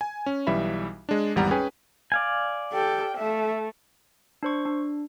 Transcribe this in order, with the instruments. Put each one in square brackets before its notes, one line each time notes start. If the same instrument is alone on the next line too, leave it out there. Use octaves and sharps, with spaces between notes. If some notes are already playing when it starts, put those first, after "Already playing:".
[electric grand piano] G#5
C#4
B1 E3 G3 E5 B5
G#3 D4
G#1 E2 G3 F#5 A#5
C#4 G#4 B4 G5 G#5
[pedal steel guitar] D5 F5 G#5
[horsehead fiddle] G4 A4 [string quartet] G5
[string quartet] A3 [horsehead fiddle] E5
[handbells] D4 C5 C#6
D4